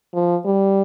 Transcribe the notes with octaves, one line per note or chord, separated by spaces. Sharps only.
F3
G3